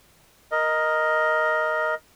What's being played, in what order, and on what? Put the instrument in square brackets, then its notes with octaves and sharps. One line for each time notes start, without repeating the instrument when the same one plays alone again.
[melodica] A#4 D#5